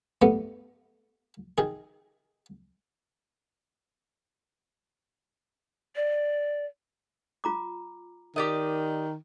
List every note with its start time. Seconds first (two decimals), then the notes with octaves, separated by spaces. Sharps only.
0.22 G2 A3 B3
1.58 D#3 G#4
5.96 D5
7.44 F4 A#5 D6
8.36 D#3 G4 D5 D#5